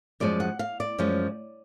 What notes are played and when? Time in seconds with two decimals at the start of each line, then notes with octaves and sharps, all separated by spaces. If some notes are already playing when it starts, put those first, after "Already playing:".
0.20 F#2 F3 G#3 C#4 D5
0.40 F#5
0.59 F5
0.80 D5
0.99 F#2 F3 G#3 C#4